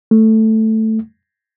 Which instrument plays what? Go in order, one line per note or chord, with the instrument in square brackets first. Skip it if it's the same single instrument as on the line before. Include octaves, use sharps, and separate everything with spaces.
[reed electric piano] A3